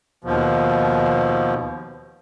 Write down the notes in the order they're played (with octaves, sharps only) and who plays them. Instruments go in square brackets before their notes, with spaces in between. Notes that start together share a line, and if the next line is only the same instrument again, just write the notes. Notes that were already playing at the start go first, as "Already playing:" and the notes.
[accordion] D#2 B2 F3